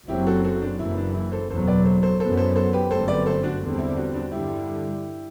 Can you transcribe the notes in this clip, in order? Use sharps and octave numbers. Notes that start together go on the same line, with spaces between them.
F#1 F#2 F#3 C4 E4 G4
F#4 A4
F#4 A4
D4
F#1 F#2 E3 E4
D4
E4
A4 C5
F#1 E2 B2 F#3 A4 C5
B4 D5
A4 C5
A4 C5
F#2 E3 B3 A4 C5
A4 C5
A4 C5
G4 B4
G1 F#2 D3 A3 C4 A4 C5
B4 D5
A4 C5
D4 F#4
E2 D3 G3 C4
E4
D4 F#4
D4 F#4
G2 D3 G3 E4 G4